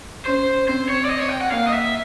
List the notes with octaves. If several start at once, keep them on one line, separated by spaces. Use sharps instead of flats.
C#4 C5
C4 C5
C#5
D5
D#5
C#5
G5
F#5
A#3 F5
D#5
E5